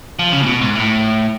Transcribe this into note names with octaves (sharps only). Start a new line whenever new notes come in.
F3
C#3
A2
B2
G#2
A2